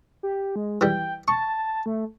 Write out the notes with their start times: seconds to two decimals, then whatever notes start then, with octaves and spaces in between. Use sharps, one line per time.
0.23 G4
0.56 G#3
0.81 E3 G3 G5
1.28 A5 C#6
1.86 A3